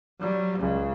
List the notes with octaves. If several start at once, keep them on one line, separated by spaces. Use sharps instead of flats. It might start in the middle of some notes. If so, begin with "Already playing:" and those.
F#3 G3
C#2 C#3